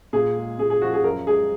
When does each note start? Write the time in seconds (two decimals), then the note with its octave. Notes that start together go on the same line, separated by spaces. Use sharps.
0.13 A#2 G#4
0.36 G#3
0.59 A#2 G#4
0.70 G#4
0.82 F3 F#4
0.94 G#4
1.04 F#2 A#4
1.27 G#3 G#4